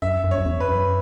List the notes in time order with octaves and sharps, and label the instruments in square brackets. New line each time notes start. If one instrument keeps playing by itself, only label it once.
[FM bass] F#2 [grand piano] E5
[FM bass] F#2
[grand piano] C#5
[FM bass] F#2
E2
[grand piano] B4
[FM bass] F#2